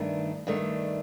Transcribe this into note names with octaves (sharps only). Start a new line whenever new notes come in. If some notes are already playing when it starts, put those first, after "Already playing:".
Already playing: G2 D#3 A3 D4
G2 D#3 A3 D4